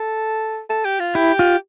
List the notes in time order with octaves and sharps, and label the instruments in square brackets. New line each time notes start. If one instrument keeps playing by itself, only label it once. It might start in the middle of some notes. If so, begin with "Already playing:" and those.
Already playing: [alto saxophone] A4
A4
G4
F4
[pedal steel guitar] E4 [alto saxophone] G4
[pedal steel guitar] F4